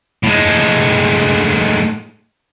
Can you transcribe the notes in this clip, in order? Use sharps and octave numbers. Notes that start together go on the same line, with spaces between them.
A2 G#3